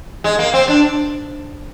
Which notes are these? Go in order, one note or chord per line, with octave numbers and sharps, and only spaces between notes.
G#3
A#3
C4
D4